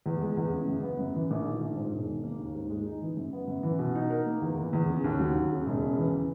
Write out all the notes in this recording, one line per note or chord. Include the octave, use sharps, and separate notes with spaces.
E2
G#3
E2
C#3
F#2
B3
F#2
E3
A#1
D#3
A#1
G#2
E1
D#3
A#3
D#2
G#2
G#3
D#4
E3
F#2
B3
F#2
E3
B2
D#4
A#4
A#3
E2
E3
E2
C#3
D#2
F#3
D#2
C#3
E1
C#3
E3